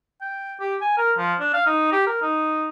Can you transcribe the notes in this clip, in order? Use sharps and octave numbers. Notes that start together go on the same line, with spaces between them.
G5
G4
G#5
A#4
F3
D4
F5
D#4
G4
A#4
D#4